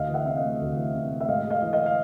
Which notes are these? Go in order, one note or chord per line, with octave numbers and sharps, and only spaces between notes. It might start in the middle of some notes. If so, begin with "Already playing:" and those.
Already playing: D2 D#5 F5
E3
E5 F#5
C3 E5
D#5 F5
A3
D2
E3
C3
A3
E5
G#2 D#5 F5
G#3
D#5 F5
E3
D#5 F5
F5